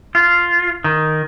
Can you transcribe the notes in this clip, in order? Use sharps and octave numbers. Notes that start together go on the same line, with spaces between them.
F4
D#3